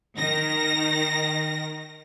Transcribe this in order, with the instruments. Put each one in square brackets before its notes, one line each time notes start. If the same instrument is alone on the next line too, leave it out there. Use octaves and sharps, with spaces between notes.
[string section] D#3 A#6